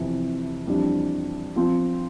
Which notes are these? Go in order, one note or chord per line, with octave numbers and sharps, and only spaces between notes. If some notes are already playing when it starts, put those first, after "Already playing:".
Already playing: F2 C3 E3
F2 E3 G3 D4
F3 C4 F4